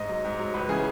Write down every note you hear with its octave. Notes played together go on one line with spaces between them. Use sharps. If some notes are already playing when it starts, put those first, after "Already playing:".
Already playing: G#2 D#5
F#3
G#2
F#3
C#2 B4
C#3 E3 G#4